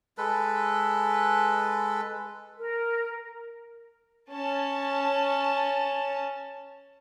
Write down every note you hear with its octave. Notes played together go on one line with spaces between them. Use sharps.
G#3 A4 B4
A#4
C#4 A5